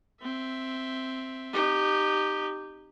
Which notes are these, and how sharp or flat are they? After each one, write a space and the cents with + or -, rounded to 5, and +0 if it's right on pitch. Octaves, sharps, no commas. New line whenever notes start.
C4 +0 E5 +0
D#4 -25 G4 -5